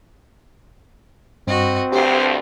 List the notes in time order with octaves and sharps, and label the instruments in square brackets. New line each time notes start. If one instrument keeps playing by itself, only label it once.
[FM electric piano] G2 [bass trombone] C4 [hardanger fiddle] F#4 D#5
[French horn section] D2 G2 [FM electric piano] G4 [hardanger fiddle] C5